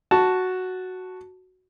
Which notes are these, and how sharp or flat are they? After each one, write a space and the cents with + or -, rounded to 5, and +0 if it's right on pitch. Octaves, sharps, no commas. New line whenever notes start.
F#4 +0 A5 +0